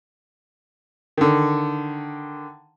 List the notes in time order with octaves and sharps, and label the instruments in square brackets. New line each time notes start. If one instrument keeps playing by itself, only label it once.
[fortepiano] D3 D#3